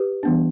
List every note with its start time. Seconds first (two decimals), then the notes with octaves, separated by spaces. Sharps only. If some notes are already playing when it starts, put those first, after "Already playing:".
Already playing: G4 B4
0.23 E3 G3 B3 D4